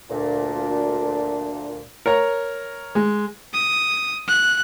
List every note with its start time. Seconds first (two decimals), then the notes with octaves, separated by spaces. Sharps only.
0.11 D2 A#2 D4
2.06 A#4 C#5 A#5
2.95 G#3
3.54 D#6
4.28 F#6